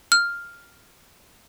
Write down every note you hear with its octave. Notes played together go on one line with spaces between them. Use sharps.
F6